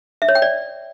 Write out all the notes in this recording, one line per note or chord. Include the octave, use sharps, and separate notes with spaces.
E5
C#5
G5
D5